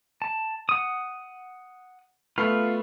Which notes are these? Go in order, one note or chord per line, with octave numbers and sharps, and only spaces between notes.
A5
F#5 D#6
A3 B3 F4 B5 F6 C7